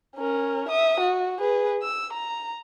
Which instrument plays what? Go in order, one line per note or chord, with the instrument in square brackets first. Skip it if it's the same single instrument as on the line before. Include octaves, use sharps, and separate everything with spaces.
[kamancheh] C#4 A#4
E5 D#6
F#4
G#4 B4
E6
A#5